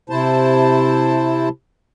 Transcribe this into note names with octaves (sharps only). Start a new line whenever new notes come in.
C3 E4 C5 A5